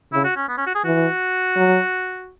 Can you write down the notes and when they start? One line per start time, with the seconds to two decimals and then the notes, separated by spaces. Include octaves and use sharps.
0.13 C#3 E4
0.24 F#4
0.36 C#4
0.48 B3
0.57 C#4
0.66 F#4
0.75 G#4
0.84 E3 F#4
1.56 F#3